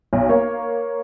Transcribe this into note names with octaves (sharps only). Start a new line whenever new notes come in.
B1
A#3 C#5